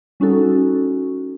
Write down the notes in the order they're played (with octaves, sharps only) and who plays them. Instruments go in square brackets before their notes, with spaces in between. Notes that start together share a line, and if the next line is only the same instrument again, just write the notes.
[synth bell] G3 C#4 D#4 F#4 A4